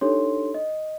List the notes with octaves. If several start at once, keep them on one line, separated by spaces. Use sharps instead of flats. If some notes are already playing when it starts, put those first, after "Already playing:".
D4 D#4 G4 A4 C#5 C6
D#5